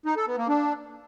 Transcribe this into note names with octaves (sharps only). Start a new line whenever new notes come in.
D#4
A4
B3
A#3
D4